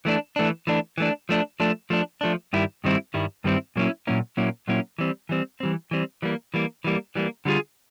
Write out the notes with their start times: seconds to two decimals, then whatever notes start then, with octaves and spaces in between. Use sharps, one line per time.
0.05 E3 A3 D4
0.36 E3 A3 D4
0.67 E3 A3 D4
0.98 E3 A3 D4
1.29 F3 A3 D4
1.60 F3 A3 D4
1.90 F3 A3 D4
2.21 F3 A3 D4
2.53 G2 D#3 G3 E4
2.84 G2 D#3 G3 C4 E4
3.14 G2 D#3 G3 E4
3.44 G2 D#3 G3 C4 E4
3.76 A#2 F#3 A#3 C#4 E4
4.07 A#2 F#3 A#3 C#4 E4
4.37 A#2 F#3 A#3 C#4 E4
4.68 A#2 F#3 A#3 C#4 E4
4.98 E3 G3 C4
5.29 E3 G3 C4
5.60 E3 G3 C4
5.91 E3 G3 C4
6.22 E3 G3 A#3
6.54 E3 G3 A#3
6.84 E3 G3 A#3
7.15 E3 G3 A#3
7.45 D3 G3 C4 F4 G#4